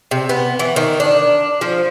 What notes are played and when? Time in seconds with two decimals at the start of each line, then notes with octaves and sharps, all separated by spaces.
0.11 C3
0.29 B3
0.59 E3
0.76 D#3
1.00 D4
1.61 F3